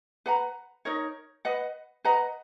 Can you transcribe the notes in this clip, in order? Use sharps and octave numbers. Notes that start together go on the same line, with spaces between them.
B4 F#5 A#5
D#4 A#4 C#5
B4 D#5 F#5
B4 D#5 F#5 A#5